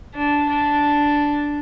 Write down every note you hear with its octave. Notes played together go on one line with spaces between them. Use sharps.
D4
D4